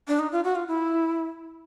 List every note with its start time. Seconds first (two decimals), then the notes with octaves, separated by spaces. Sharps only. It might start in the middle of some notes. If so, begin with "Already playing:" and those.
0.08 D4
0.19 D#4
0.32 F4
0.44 F#4
0.55 F4
0.68 E4